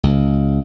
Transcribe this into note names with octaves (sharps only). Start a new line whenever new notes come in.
C#2